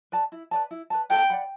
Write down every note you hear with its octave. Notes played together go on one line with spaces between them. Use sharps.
B4 D5 A5
E4
B4 D5 A5
E4
B4 D5 A5
A4 G5
D5 F#5 B5